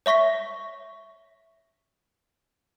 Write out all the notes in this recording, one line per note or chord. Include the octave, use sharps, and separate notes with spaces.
C#5 E5 C#6 A#6 B6